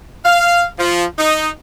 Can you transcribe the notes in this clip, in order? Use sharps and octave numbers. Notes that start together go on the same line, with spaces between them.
F5
F3
D#4